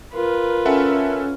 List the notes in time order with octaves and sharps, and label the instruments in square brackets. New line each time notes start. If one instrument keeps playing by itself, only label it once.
[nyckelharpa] F4 B4 [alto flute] A#4
[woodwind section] C#4 [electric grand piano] A4 E5 F#5